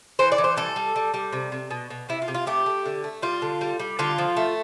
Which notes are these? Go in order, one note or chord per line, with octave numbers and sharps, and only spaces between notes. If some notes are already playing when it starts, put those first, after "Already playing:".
E3 C5
D5
E3
C5
G3 A4
G3
G3
G3
C3
C3
B2
B2
C3 E4
F4
C3
F4
A3 G4
A3
D3
A3
G3 F4
D3
G3
G3
D3 F4
F3
A3